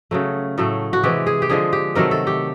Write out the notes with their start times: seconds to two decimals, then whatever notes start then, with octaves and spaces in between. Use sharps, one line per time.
0.11 C#3 F#3 A3
0.58 A2 F#3 A3
0.93 F#4
1.03 C3 E3 G#3 G4
1.27 G#4
1.42 G4
1.49 D3 F3 G#3 G#4
1.73 G4
1.95 C3 D#3 F#3 A3 A#4
2.11 A4
2.27 G4